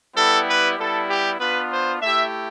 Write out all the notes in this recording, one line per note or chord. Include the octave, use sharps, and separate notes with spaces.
G3 B3 E4 G4 A4
B4
G3 B3 E4 A4
G4
B3 D4 F4 B4
C5
A3 E4 G4 E5